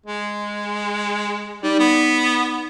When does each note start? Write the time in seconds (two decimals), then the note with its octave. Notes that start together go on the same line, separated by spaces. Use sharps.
0.06 G#3
1.63 G3 D#4 D5
1.80 B3